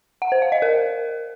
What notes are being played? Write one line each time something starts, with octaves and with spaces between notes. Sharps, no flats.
F#5
C5
F5
D#5
A#4